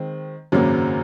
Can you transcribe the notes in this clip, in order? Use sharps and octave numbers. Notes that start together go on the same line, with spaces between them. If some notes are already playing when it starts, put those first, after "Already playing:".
Already playing: D#3 G#3 C4
G#1 F#2 C#3 F#3 A#3